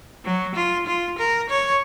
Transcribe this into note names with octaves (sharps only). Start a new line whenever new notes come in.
F#3
F4
F4
A#4
C#5